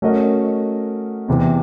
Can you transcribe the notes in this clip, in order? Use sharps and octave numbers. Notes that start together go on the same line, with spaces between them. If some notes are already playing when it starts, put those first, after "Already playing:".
A3 C#4 F#4 A#4 D#5
E2 C3 E3